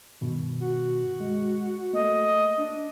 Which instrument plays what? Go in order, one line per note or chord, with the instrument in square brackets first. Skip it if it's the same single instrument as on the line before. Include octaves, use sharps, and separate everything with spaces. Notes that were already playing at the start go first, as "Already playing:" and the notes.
[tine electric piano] G2 B2 D#3
[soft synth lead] F#4
[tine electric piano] G#3
[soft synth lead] A3 [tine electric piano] A#3 [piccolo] D#5
[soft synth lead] D4